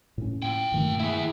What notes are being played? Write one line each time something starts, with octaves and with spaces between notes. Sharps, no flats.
A2 C#4
A#2 G5
G2 D#3 A3
E4 G#4